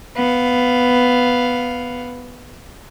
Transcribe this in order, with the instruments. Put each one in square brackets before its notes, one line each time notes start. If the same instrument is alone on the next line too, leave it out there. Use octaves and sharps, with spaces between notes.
[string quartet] B3 F5